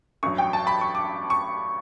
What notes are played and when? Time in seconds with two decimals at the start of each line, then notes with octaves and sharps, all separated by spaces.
0.23 A1 G2 F#3 C#6
0.38 G5
0.53 A5
0.67 B5
0.81 C#6
0.95 D6
1.30 C#6